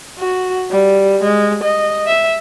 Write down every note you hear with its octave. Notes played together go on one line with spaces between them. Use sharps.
F#4
G3
G#3
D#5
E5